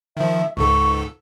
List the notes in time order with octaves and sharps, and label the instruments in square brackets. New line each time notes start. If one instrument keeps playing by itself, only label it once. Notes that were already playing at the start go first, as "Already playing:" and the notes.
[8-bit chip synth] D#3 F3 [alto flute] E5
[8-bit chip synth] C#2 G#2 A4 [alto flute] C#6